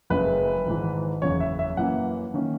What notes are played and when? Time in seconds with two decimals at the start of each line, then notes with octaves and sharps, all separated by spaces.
0.10 F#1 F#2 C#3 G#3 B4
0.66 G#1 G#2 E3
1.22 F#1 E2 C#3 C#5
1.40 E5
1.59 E5
1.77 F#2 E3 A#3 C#4 F#5
2.34 D#3 A#3 C#4